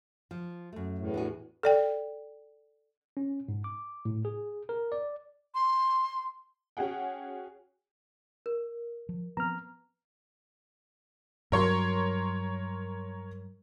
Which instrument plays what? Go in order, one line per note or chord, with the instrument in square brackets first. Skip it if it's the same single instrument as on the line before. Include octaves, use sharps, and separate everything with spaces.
[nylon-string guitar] F3
F#2 A3
[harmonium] E2 A2
[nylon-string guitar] D4 F#4 G#4
[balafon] A4 D5 G5
[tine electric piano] C#4
G#2
D6
A2
G#4
A#4
D5
[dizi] C6
[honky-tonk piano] C#4 F#4 G#4 F#5 G5
[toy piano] A#4
[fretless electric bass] F3
[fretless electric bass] F3 B3 C4 [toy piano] B4 [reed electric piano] A#5 F6
[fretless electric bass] G2 F#3 [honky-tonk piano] A#4 C#5 C6